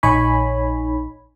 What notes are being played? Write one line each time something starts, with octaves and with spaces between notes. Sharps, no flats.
A#1 D#4 C#5 G#5 B5